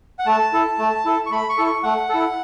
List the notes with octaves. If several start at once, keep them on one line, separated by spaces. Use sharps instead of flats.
F#5
A3 A5
E4 A4
A3
E4 A4
C#6
A3 B5
C#6
E4 A4
C#6
A3 F#5
E4 A4